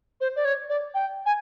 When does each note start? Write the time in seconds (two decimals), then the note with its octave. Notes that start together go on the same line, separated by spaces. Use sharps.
0.21 C5
0.36 D5
0.45 C#5
0.69 D5
0.94 G5
1.26 G#5